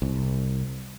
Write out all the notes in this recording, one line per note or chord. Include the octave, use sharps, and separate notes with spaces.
C2